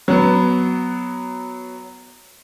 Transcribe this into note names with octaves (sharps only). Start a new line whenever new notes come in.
F#3 B3